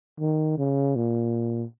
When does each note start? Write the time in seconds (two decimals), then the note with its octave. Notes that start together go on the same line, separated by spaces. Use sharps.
0.20 D#3
0.58 C#3
0.96 A#2